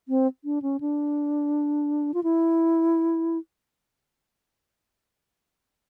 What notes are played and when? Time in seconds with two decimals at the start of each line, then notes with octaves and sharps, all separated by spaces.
0.08 C4
0.44 D4
0.62 C#4
0.80 D4
2.14 F4
2.23 E4